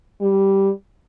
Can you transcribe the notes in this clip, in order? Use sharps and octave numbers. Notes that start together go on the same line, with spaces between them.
G3